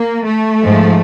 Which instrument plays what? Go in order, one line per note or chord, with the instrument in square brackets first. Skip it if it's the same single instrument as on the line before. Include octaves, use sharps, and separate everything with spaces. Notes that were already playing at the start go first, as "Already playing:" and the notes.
Already playing: [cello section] A#3
A3
G#2 F3 G#3